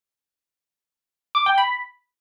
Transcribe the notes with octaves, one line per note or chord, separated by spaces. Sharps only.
D6
G5
B5